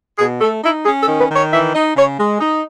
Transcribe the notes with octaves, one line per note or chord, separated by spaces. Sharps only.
B2 G#4
A3 A4
D#4 E4
C#4 G#4
A4
D#3
B4
D#3
C#5
E3 E5
D#4 D#5
C#3 C#5
G#3
D#4